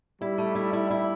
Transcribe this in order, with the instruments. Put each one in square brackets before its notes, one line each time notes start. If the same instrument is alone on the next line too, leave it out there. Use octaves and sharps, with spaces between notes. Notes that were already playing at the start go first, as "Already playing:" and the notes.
[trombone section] G3 [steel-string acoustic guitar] E4
[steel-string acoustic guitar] A3
E4
E4
E4